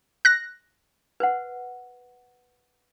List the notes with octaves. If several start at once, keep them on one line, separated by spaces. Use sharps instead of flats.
F#6 A#6
B4 C5 F#5